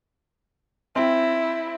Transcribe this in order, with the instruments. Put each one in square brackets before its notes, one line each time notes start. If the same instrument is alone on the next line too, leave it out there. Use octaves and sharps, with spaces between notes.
[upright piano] C4 [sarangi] E4